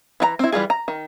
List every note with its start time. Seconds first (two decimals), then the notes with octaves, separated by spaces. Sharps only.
0.20 E3 F#4 A#5
0.39 C4 E4
0.52 E3 G3 F4 G#4
0.70 A#5
0.88 D#3